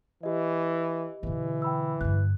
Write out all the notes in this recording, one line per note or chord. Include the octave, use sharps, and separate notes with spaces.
E3 G4 D#5
B2 D3 E3
G5 B5 E6
G2 D3 F#6